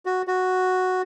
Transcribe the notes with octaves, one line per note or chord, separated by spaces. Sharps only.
F#4
F#4